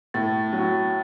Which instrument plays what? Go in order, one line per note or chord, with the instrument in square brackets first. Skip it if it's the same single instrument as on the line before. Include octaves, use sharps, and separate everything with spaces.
[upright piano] A2 [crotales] A6
[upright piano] F#3